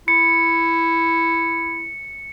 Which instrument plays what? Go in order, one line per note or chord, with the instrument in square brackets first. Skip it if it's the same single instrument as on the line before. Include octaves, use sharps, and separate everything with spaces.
[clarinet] E4 [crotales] C#7